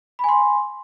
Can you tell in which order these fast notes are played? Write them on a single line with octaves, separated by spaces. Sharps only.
B5 G#5 C6